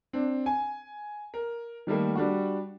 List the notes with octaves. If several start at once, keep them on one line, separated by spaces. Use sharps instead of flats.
C4 D4
G#5
A#4
D#3 G3 A3 A#3
G3 D4 F#4